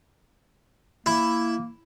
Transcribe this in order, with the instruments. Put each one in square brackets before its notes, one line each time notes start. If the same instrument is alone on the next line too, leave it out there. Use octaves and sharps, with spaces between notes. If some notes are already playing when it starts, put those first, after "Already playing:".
[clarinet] A#3 [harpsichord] E4